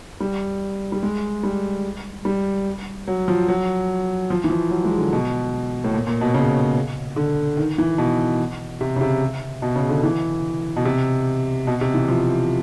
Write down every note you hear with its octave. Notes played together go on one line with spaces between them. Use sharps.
G3
G3
G#3
G3
G3
F#3
F3
F#3
F3
E3
F3
F#3
G#3
D3
B2
A2
A#2
A#2
B2
C#3
D3
D#3
E3
B2
C3
C#3
C3
B2
C#3
D3
E3
B2
C3
B2
C3
E3
F3